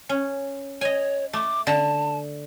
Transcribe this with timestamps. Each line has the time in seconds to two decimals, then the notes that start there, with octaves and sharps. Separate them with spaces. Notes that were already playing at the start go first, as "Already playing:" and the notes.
0.09 C#4
0.81 C#5 D#5 G#5
1.33 A3 D6
1.67 D3 A5